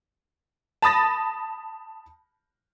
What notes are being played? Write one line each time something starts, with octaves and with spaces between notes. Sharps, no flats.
A5 B5 D#6 A6 A#6